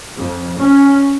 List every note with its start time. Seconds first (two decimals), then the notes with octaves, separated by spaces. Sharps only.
0.19 F2
0.59 C#4